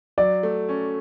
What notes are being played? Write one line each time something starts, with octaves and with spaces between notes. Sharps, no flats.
F#3 D5
A3
C#4